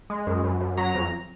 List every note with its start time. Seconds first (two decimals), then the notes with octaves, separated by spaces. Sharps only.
0.10 G#3
0.27 F#2
0.44 F#2
0.60 F#2
0.77 F#3 A#5
0.95 F2